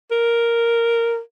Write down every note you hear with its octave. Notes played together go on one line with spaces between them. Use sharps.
A#4